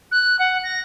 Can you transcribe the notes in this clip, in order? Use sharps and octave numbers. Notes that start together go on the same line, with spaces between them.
F#6
F#5
A#6